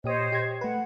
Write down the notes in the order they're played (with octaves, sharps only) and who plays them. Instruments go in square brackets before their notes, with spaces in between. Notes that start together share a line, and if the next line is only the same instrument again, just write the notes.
[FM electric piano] A#2 G4 D#6 [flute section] C5 C#5 D#5
[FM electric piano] G4 G#6
[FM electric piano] A3 B4 [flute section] F#5